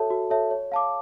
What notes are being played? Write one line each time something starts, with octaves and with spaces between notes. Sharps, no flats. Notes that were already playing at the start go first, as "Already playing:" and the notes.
Already playing: F#4 A4 C#5 E5 A5
F#4
A4 C#5 E5 A5
C#5
F5 A5 D6